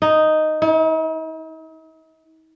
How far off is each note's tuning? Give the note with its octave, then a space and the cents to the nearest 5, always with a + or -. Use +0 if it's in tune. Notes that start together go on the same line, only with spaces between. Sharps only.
D#4 +0
D#4 +45